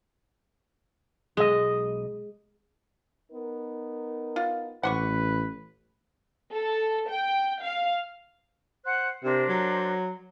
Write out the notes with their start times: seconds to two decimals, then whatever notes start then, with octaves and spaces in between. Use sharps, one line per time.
1.37 B1 G#3 D#5
3.32 B3 D#4 A#4
4.36 F4
4.83 A1 B4 F#5 C6 C#6
6.52 A4
7.09 G5
7.61 F5
8.84 C5 F#5 F#6
9.24 C3 D4 A#4 C5
9.49 F#3